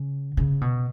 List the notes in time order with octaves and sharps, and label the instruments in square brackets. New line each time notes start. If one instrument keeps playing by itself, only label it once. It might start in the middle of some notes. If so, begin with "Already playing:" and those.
Already playing: [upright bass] C#3
C#3
B2